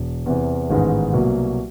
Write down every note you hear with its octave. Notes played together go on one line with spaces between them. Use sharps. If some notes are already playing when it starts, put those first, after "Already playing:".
Already playing: E1
E2 C3 E3
A1 G#2 D#3 G#3 B3
C2 B2 F#3 A#3